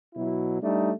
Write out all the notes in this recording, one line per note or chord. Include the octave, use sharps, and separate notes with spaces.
B2 F#3 E4
G3 A3 D4 D#4